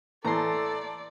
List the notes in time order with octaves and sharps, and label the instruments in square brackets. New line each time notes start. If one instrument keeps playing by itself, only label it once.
[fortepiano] A2 E3 [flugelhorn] A4 [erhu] D5 [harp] A#5 C6